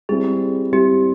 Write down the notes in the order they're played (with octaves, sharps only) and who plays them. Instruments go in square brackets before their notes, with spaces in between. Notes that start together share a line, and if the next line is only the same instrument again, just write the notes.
[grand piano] G3 C4 E4 [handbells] G#4
[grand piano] G3 C4 E4 [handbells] G4